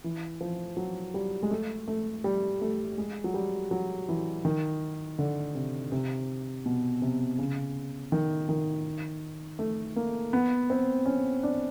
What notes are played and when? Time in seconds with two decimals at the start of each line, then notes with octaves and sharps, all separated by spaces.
0.04 E3
0.41 F3
0.77 F#3
1.14 G3
1.43 G#3
1.51 A3
1.88 A3
2.24 G3
2.62 A3
2.98 G#3
3.24 F#3
3.34 G3
3.71 F#3
4.09 E3
4.45 D#3
5.19 D3
5.55 C3
5.92 C3
6.66 B2
7.02 C3
7.38 C#3
8.12 D#3
8.49 D#3
9.59 A3
9.96 A#3
10.33 B3
10.70 C4
11.06 C#4
11.43 D4